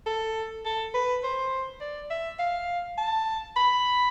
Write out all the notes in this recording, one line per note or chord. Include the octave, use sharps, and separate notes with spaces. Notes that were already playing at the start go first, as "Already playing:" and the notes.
A4
A4
B4
C5
D5
E5
F5
A5
B5